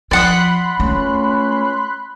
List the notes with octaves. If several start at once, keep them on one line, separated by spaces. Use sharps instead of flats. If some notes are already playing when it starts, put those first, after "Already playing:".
F3 D5 F#5 B5 C6 D#6 F#6
C#2 A3 C#4